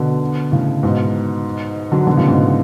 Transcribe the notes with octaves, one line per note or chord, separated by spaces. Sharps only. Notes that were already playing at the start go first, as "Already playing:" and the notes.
Already playing: B2 D3
A2 C#3
G#2 B2
D3 F#3
B2 D3
A2 C#3
G#2 B2